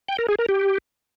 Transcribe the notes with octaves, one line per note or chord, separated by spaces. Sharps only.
G5
A#4
G#4
A#4
G4